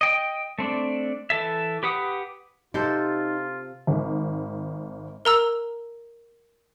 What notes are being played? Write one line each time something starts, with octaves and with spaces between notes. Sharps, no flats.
D#5 G5
A3 C4 D4
E3 A4 E5
G4 B4 F#5 D#6
C3 D#4 F4 A4 C5
G#1
A#4 A#5 E6